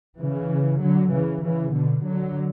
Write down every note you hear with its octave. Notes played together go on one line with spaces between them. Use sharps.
C#3 E3
D3 F#3
C#3 E3
C#3 E3
B2 D3
D3 F#3